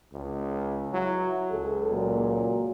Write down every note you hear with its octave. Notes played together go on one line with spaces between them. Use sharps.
C#2
F#3 E4
C#2 G#4 A4
A#2 F#3